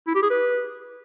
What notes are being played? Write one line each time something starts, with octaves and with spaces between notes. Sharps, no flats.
E4
G4
G#4
B4